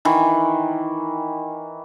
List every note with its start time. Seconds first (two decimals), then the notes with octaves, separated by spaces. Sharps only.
0.05 D#3 E3